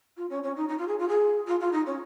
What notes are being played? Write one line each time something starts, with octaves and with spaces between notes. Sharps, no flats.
F4
C#4
C#4
D#4
D#4
F4
G#4
F4
G#4
F4
F4
D#4
C#4